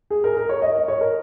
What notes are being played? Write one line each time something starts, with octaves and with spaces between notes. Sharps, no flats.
G#4
A#4
A#4
C#5
D#5
D#5
C#5
A#4